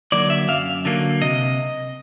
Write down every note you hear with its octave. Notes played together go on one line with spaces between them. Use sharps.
D3 F#3 A#3 D5
E5
F#2 F5
D3 F#3 A#3
C3 D#5